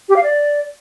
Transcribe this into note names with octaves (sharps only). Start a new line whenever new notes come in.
G4
F5
D5